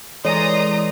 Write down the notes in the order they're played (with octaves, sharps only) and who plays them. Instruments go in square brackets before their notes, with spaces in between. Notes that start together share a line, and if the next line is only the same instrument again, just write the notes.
[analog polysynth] E3 G#3 D5 [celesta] A4 [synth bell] C#5 [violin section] A#5 C6 D#6